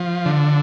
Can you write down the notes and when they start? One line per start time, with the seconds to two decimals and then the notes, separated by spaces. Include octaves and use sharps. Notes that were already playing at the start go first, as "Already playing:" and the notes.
Already playing: F3
0.26 D3